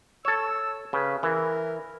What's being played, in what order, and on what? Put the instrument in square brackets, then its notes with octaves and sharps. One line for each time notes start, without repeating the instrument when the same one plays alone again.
[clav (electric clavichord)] A4 C#5 [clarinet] E6
[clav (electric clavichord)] C#3 [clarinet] B4
[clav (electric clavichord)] E3 [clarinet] A#4